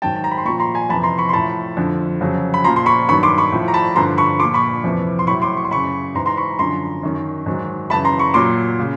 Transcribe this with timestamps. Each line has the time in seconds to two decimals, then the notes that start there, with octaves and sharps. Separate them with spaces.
0.02 G#2 D#3 F#3 G5 A5
0.16 A5
0.24 A#5
0.31 B5
0.38 C6
0.45 A#2 B5 C#6
0.49 F3
0.60 A#5 C6
0.74 G#5 A#5
0.89 F2 C3 E3 A5 B5
1.03 A#5 C6
1.18 B5 C#6
1.29 C6
1.33 A2 F3 A5 B5
1.77 F2 D3 F3
2.21 F2 C#3 F#3
2.54 B5
2.64 A#2 F3 A#5 C6
2.76 C6
2.86 B5 C#6
3.09 G2 D#3 F#3 B5 C#6
3.23 C6 D6
3.38 B5 C#6
3.52 A2 F3
3.68 A#5
3.74 A5 B5
3.96 G2 D3 F3 A#5 C6
4.18 B5 C#6
4.39 A#2 F3 C6 D6
4.54 B5 C#6
4.84 F2 C3 E3
5.19 C6
5.27 A2 F#3 B5 C#6
5.42 C6 D6
5.57 C#6
5.65 C6
5.71 F#2 C#3 F#3 B5 C#6
6.15 G#2 E3 A#5 C6
6.26 A#5 C6
6.37 B5 C#6
6.59 F#2 D3 F3 A#5 C6
7.03 F#2 D#3 F#3
7.46 G#2 D#3 F#3
7.90 F#2 C#3 E3 A5 B5
8.05 A#5 C6
8.19 B5 C#6
8.34 A#2 F#3 C6 D6
8.80 C#3